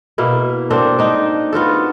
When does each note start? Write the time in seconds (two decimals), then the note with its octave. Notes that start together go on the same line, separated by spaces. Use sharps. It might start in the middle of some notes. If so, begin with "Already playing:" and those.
0.18 B2 A#3 E4
0.70 A#3 C4 D4 A4
0.99 D4 D#4
1.53 B3 F4 F#4 A4